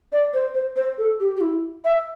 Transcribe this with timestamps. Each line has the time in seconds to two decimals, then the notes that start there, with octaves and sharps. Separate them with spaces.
0.12 D5
0.33 C5
0.54 C5
0.76 C5
0.98 A4
1.20 G4
1.37 G4
1.41 E4
1.84 E5